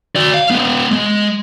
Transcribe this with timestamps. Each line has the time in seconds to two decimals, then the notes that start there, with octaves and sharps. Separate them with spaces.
0.16 F#4 D5
0.34 F5
0.51 G#3 B3
0.92 G#3